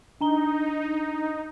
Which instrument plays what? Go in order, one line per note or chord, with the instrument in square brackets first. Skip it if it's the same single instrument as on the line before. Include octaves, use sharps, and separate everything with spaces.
[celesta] D4 A#5 G7 [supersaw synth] D#4